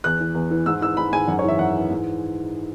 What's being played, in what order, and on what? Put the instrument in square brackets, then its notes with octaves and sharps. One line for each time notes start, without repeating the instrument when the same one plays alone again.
[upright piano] E2 F#6
E3
E2
E3
G#2 E6
E3 E6
G#2 B5
G#2 G#5
F#2 F#5
C#5
E3 E5
F#2 F#5
E3
G#2